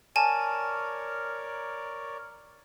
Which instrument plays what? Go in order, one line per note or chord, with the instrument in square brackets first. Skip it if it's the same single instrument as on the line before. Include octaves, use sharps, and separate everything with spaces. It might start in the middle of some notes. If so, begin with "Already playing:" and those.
[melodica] A#4 C#5 D5 [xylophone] G#5 A5